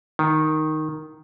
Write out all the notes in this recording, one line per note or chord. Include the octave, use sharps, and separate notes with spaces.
D#3